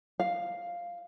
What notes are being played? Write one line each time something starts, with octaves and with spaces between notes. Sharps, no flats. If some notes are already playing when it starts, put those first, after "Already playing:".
F5